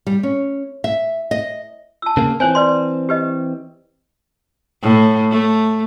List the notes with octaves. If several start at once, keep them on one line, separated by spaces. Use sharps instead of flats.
G3
C#4
E5
D#5
A5 E6
C#3 A#3
E3 C4 C5 C#5 G#5
B4 D5 C6
G4 B4 D#5
A2
A3